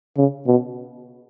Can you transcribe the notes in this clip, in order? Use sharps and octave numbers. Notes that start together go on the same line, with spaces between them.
C#3
B2